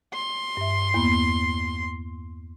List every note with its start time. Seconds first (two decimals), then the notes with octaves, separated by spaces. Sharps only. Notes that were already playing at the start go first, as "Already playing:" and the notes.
0.14 C6
0.57 G2 E5
0.94 E2 A#3 B3